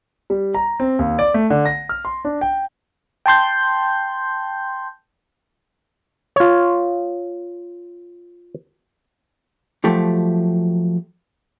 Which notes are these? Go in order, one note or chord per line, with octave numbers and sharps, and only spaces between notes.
G3
A#5
C4
D#2
D5
A3
D3
A#6
F6
C6
D4
G5
G5 A5 C6 G6
F4 C#5
F3 F#3 A3 G4